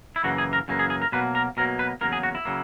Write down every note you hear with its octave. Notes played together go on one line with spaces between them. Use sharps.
E4
F#2 C#3 E3 A#3 F#4
G#4
A#4
F#2 C#3 E3 A#3
G#4
G#4
A#4
B2 F#3 A#3 B4
A#4
B2 F#3 A#3 A#4
B4
E2 C#3 F#3 A#3 A#4
G#4
F#4
E4
C#3 F#3 A#3